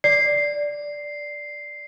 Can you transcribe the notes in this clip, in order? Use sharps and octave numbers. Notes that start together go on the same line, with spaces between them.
D5 C7